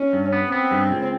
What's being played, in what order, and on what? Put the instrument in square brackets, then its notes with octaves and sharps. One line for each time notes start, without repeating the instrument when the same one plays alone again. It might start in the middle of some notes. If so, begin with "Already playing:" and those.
Already playing: [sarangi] C#4
[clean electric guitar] G2
B3
[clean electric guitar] B3 [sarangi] C4
[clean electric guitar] G2
C#2